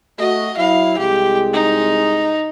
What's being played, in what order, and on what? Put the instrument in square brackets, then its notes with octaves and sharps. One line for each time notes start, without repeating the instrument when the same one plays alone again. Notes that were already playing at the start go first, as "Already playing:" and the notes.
[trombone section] A3 F#4 [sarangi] D#5
[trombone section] F#3 E4 [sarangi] F5
[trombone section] C2 G#3 [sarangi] G4
[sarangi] D#4